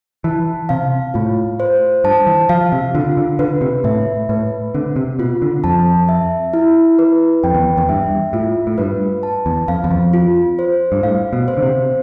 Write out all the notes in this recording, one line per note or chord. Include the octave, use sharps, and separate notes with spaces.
E3 A5
C3 F5
A2 F4
C5
G2 A5
E3
F3 F5
C3
D3 F4
D3
D3 B4
C3
A2 E5
A2 B4
D3 C4
C3
B2 F4
D3
F2 A5
E5
E4
B4
F2 G5
E2
E2
G2 E5
A2 F4
A2
G2 B4
A5
E2
F2 F5
E2
F2
F4
C5
G2
A2 F5
B2
C5
D3
C3